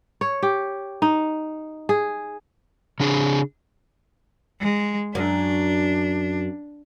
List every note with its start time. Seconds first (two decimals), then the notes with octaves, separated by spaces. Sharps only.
0.21 C#5
0.43 G4
1.02 D#4
1.89 G#4
3.00 C#3 D4 G#4
4.61 G#3
5.15 F#2 D4